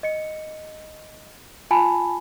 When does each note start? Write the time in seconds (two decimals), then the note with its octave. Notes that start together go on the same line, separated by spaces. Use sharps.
0.03 D#5 C#7
1.71 F4 G#5 A5 B5